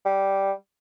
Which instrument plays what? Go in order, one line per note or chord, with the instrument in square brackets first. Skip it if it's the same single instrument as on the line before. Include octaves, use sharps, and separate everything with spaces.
[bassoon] G3